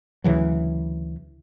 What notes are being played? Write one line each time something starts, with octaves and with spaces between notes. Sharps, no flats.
D2 C#3 E3 F#3